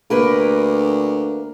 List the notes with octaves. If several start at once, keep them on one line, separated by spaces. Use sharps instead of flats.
D2 A#3 A#4 B4